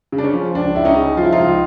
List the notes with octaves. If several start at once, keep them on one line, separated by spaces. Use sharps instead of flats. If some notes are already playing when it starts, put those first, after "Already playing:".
C#3
D4
C#4
F3
C#2 D4
C#2 E4
C#4 D#4
C#3
F3 F4
E4
D#4 F4
C#2